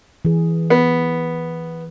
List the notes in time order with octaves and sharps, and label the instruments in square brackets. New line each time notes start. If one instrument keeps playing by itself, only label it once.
[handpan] E3 G#4
[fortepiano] B3